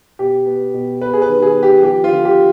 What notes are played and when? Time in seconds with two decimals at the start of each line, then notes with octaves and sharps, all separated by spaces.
0.19 B2 G4
0.46 B3
0.74 B2
1.01 B3 B4
1.13 G#4
1.22 B4
1.29 D#3
1.42 G#4
1.56 B3
1.63 G4
1.83 F3 G4
2.04 F4
2.11 D3
2.25 G4